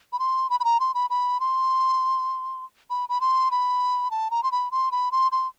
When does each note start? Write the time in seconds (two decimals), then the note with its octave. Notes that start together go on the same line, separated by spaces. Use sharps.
0.13 B5
0.19 C6
0.50 B5
0.60 B5
0.64 A#5
0.80 C6
0.94 B5
1.10 B5
1.40 C6
2.90 B5
3.09 B5
3.21 C6
3.51 B5
4.11 A5
4.31 A#5
4.43 C6
4.52 B5
4.71 C6
4.92 B5
5.12 C6
5.32 C6